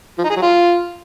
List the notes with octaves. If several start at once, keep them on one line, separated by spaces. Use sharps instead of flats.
F3
D#4
G#4
F#3
F4